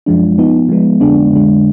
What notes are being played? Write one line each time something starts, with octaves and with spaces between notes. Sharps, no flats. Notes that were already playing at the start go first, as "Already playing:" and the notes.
F#2 F3 G#3 D4
F3 B3 D#4
F3 G#3 B3
F2 D3 G#3 B3 D4
F2 D3 G#3 D4